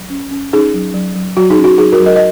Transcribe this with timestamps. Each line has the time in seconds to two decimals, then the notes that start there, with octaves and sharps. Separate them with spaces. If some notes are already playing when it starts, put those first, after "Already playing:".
Already playing: F#3
0.10 C#4
0.31 C#4
0.53 C#4 D#4 G#4
0.74 F#3
0.94 F#3
1.16 F#3
1.37 F#3 F#4
1.50 D#4 G#4
1.58 C#4
1.64 F#4
1.78 F#3 D#4 G#4
1.92 F#4 A#4
2.00 F#3
2.06 A#4 D#5
2.16 D#5